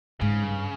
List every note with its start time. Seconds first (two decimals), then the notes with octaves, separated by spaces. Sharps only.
0.21 G#2 C#3
0.42 G2